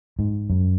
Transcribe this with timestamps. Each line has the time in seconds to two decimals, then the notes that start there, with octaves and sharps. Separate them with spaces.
0.19 G#2
0.50 F#2